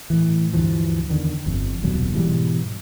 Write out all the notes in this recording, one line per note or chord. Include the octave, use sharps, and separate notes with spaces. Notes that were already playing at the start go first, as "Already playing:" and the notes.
A2 E3
D2 G2 E3 F3
E2 D3 D#3
G1 F2
D#1 C2 B2 F#3
G#2 B2 E3 G3